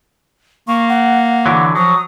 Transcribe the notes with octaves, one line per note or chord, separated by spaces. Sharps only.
A#3 C#6
F#5
D3 E3 F#3
F3 F#3 D#6